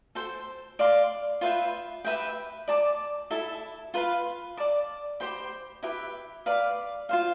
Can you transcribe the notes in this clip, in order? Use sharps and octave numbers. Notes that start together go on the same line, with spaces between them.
A4 C5 G5
D5 F5 C6
F4 B4 E5 G5
G4 B4 E5 G5
D5 A5 D6
E4 A4 E5 A5
F4 B4 F5 B5
D5 A5 D6
G4 C5 G5 B5
E4 G4 B4 E5
B4 D5 F5 B5
F4 C5 F5